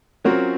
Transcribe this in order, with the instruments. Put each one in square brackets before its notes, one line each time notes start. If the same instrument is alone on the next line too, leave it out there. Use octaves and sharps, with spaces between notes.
[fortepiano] F#3 C4 F#4 A#4 [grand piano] C#4 F4